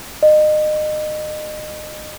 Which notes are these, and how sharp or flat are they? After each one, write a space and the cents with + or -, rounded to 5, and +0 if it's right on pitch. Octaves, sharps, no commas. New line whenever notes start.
D#5 -30